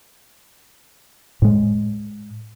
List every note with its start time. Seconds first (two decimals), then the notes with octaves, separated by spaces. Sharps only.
1.42 A2 G#3